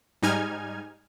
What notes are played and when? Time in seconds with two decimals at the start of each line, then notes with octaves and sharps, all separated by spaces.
0.22 G#2 G3 D#4 G#5 F6 G#6